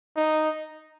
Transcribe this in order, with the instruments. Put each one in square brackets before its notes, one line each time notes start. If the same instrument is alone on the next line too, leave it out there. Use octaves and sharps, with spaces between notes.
[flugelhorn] D#4